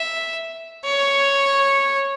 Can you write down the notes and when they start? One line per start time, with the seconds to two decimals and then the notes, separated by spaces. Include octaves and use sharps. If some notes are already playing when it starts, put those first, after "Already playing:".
Already playing: E5
0.84 C#5